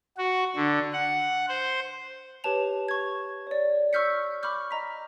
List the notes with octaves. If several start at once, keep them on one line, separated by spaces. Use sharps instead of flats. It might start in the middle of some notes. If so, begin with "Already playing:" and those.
F#4
D3
F#5
C5
G4 B4 C#5 A5 F7
C#6 G#6
C#5 D5
C#6 E6 F6 G6 B6 C#7
B5 C#6 D6 F6 G6
D#5 A#5 B6